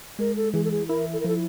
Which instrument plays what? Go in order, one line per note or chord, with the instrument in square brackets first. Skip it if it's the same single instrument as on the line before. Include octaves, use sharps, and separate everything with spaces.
[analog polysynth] G#3 [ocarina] A#4
[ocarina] A4
[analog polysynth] E3 [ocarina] G#4
[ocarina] A4
G#4
[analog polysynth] E4 [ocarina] A#4
[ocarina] A4
A#4
[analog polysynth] F3 [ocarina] A4